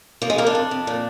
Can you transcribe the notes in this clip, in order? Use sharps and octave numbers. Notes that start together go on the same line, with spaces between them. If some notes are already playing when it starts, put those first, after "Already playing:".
F3 A#3
G#3
F2 A#3
D4
F2
F2
A#2